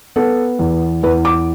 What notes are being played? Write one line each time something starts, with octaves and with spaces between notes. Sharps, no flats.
B3 A4
E2
E2 B4
D6